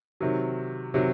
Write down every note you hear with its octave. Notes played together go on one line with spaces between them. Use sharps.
C3 D#3 F#3
C3 D#3 F#3